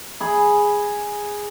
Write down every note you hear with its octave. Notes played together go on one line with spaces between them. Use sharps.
G#4 B5